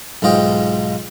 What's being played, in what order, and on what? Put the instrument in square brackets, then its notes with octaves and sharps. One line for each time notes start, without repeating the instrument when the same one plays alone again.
[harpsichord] B1 G#2 F4 D#5 G5